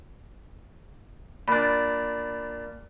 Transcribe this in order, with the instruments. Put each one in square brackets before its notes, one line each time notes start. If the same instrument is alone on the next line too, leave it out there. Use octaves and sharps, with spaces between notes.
[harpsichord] A#2 D4 [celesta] B5